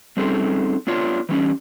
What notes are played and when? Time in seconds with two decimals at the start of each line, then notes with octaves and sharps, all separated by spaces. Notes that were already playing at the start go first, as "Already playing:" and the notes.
0.17 G3 C4 C#4 D#4 G#4 A4
0.87 B3 D4 F4 C#5
1.29 E3 G3 C#4 D4